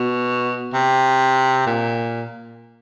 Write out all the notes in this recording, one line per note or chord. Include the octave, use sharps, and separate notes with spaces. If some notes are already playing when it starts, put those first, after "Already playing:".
Already playing: B2
C3
A#2